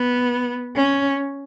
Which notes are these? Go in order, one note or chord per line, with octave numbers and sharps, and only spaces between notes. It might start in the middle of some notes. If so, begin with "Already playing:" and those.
Already playing: B3
C#4